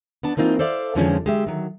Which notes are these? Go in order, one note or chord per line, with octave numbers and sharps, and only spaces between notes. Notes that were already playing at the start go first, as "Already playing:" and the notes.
B3 D4 A5
E3 A#3 C4 D#4 F4
A4 C5 D5 E5 F5
F2 D3 E3 F3 G#3 C#4
G#3 G4 E5
D#3 F#3